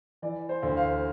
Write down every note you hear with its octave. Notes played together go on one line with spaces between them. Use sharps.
E3 D5
C5
D2
F5